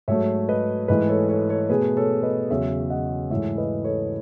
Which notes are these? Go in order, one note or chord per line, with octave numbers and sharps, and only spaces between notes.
G#2 F#3 A3 C#5 E5
B4 D#5
G#2 E3 A3 B4 D#5
A4 C#5
A4 C#5
A4 C#5
B2 A3 G#4 B4
A4 C#5
B4 D#5
E2 C#3 F#3 C#5 E5
D#5 F#5
G#2 E3 A3 C#5 E5
B4 D#5
A4 C#5